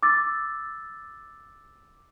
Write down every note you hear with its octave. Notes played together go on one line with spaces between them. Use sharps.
D6 E6 A6